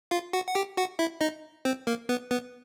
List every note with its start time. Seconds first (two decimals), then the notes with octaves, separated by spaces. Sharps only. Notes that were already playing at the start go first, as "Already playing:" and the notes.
0.11 F4 F5
0.33 F#4 F#5
0.48 F#5
0.55 G4 G5
0.77 F#4 F#5
0.99 E4 E5
1.21 D#4 D#5
1.65 C4 C5
1.87 A#3 A#4
2.09 B3 B4
2.31 B3 B4